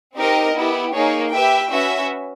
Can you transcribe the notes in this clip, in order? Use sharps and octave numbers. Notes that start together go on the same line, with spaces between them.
C4 D#4 G4 A#4 D#5
B3 E4 G4
A#3 D#4 G#4 C#5
G4 B4 E5 G5
C#4 F#4 B4 E5